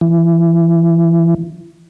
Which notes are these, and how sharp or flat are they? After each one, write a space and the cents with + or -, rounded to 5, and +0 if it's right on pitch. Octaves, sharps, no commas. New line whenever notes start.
E3 +25